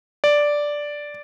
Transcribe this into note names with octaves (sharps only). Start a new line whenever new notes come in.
D5